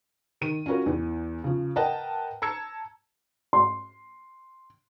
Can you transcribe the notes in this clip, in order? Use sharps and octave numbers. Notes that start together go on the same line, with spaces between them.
D#3 D#7
C#4 F4 F#4 A#4 B4
E2 E3
C#3 F3
A#4 B4 D#5 F#5 G5 A5
A5 A#5 E6 G#6 C#7
C6